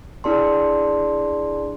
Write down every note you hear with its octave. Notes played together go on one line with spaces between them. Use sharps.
D4 E4 G#4 D5 A5 C6